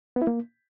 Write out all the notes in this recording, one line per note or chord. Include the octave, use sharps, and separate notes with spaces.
B3
E4
A#3